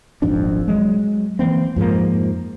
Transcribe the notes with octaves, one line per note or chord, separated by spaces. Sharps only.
D#1 G#1 F2 D4
F#3 G#3
E3 A#3 C4
F2 G#2 F3 A#3